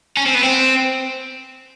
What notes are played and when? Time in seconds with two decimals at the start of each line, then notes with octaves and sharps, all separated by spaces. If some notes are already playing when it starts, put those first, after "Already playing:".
0.17 C#4
0.26 C4
0.34 B3
0.43 C4